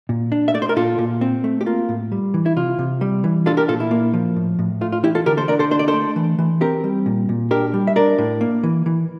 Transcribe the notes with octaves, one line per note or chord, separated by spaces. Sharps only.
A#2
D4
E5
A3 D5
C5
A#4
A#2 F4 A4
A#2
C4
A3
G4
A#3 F4
A2
G3
E3
E4
C3 F4
C3
G3
E3
D4 F4 A4
G4 A#4
A#2 F4 A4
E4
A#3
F3
A2
A2
A3 F4
F4
E3 E4 G4
F4 A4
D3 G4 A#4
A4 C5
D3 A#4 D5
A4 C5
D4 C5
D5
A4 C5
A3
E3
E3
C4 G4 A#4
G3
A#2
A#2
D4 G4 A#4
G3
E5
D4 A#4 D5
A2
A#3
E3
E3